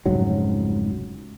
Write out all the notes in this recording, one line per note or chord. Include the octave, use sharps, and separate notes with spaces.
F1 C#2 G#2 F#3